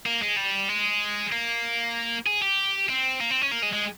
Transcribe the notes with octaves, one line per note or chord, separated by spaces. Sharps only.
A#3
G#3
G3
G#3
A#3
G#4
G4
C4
A#3
C4
C#4
A#3
G#3
G#3